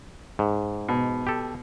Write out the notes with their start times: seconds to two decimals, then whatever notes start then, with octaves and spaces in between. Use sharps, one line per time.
0.39 G#2
0.89 B2
1.27 G4 A4